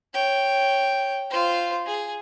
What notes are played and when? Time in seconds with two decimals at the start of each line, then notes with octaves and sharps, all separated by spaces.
0.14 C#5 G5
1.30 F4 C5
1.86 G#4